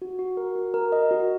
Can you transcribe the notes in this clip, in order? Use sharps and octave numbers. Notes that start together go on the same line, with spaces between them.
F#4
F#4
A#4
F#4
A#4
D#5
F#4